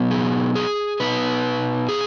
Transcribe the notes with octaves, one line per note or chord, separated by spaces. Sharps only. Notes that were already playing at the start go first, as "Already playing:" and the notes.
Already playing: B2 F#3 B3 D#4
G#4
G#4
B2 B3 D#4 B4
G#4